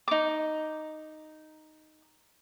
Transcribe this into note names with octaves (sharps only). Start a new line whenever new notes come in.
D#4 D6